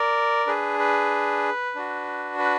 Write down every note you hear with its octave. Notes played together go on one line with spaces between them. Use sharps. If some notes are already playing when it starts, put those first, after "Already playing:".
Already playing: A#4 D5
D4 G#4 B4
B4
D4 F#4
B4